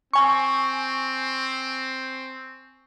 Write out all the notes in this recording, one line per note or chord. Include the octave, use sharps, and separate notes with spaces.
C4 G#5 C#6